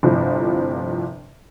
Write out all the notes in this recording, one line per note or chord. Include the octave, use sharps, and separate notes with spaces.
G1 A2 C3 F3